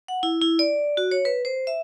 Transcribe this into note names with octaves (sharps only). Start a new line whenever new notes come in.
F#5
E4
E4
D5
F#4
C#5
B4
C5
E5